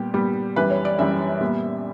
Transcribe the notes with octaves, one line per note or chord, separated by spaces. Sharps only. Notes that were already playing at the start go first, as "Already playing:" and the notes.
Already playing: A#2 G3 B3 G4
A#2 G3 B3
F#2 E3 G3 B4
C#5
D5
F#2 E3 G3 E5
A#2 G3 B3